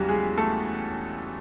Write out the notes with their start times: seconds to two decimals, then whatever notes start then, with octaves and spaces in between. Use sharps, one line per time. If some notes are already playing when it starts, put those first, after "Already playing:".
Already playing: E2 C#3 E3 F#3 G3 F#4 G4
0.08 G#3 G#4
0.37 A3 A4